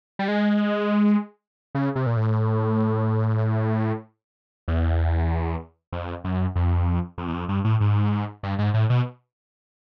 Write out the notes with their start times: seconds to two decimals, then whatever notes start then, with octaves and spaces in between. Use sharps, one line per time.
0.19 G3
0.28 G#3
1.75 C#3
1.96 C3
2.06 A#2
2.17 A2
4.68 E2
5.93 F2
6.24 F#2
6.56 F2
7.18 F2
7.28 E2
7.34 F2
7.49 G2
7.65 A2
7.81 G#2
8.43 G2
8.59 G#2
8.74 A2
8.90 B2